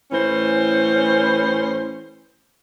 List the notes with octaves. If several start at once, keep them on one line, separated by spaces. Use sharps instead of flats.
A2 E3 C#4 C5